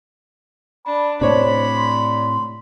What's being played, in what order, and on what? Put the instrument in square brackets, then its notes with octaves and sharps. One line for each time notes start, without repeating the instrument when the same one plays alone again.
[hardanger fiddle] D4 [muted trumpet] B5
[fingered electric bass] A2 C3 [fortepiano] D4 C#5 [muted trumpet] C5 [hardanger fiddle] B5
[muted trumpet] C6